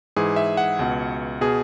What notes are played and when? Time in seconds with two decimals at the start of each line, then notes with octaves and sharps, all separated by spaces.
0.16 G#2 E3 G#4
0.36 E5
0.57 F#5
0.79 C#2 B2
1.41 B2 G#4